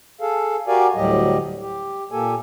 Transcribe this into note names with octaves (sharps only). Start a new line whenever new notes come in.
G#4 A4 F5
F#4 G4 A#4 D5 F5 G#5
D2 A2 F#3 G3 G4 D#5
G4
A#2 A#3 G4 A4 G#5